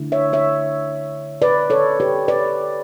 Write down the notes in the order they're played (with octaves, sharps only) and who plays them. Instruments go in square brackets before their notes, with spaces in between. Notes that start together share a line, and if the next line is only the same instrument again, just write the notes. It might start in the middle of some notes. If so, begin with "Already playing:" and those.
Already playing: [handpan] D3 A3 E4
C#5 E5
C#5 E5
B4 D5
A4 C#5
G4 B4
B4 D5